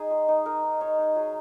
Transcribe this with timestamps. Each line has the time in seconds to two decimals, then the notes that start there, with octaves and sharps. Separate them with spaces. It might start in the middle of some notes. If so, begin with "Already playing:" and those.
Already playing: D#4 G#4
0.11 G#3
0.28 D#4
0.45 D#4 A#4
0.64 D#4
0.81 D#4 C#5
0.99 D#4
1.16 F#3 G#4